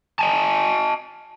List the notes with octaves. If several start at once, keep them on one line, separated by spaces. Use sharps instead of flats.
D#5 G#5 A5